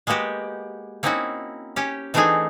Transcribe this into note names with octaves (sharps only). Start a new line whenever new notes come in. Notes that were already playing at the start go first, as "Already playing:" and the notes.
G#3 A#3 B3 F#4 G4
A#3 C4 C#4 D#4 E4 F#4
C#4 G4
E3 A3 C4 D4 D#4 G#4